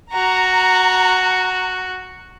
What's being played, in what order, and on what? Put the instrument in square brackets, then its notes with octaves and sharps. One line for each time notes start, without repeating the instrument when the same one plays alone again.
[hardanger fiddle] F#4 [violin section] A#5